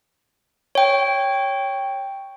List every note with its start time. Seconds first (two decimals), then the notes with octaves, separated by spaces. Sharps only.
0.75 C#5 G5